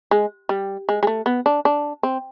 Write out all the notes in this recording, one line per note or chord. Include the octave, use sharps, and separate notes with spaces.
G#3
G3
G#3
G#3
A3
B3
D4
D4
C4